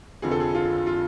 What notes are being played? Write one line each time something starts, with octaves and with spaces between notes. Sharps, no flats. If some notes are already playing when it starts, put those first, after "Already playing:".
F1 F2 D3 F3 G#4
A4
G#4
F4
F4